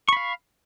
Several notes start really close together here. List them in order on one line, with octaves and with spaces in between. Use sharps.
C#6 B5 F5